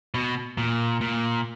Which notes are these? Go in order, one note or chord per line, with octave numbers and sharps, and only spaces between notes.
B2
A#2
A#2